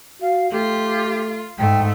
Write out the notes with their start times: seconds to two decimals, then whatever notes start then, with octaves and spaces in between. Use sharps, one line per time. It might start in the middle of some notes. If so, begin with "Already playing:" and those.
0.22 F#4 F5
0.52 A3 F4 G4
1.59 G#2 A3 G5